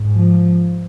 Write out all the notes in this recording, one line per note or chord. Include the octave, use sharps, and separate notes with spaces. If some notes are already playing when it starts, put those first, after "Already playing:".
Already playing: G#2
F3